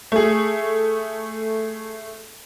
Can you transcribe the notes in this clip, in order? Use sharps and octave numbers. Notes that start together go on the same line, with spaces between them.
A3 G#4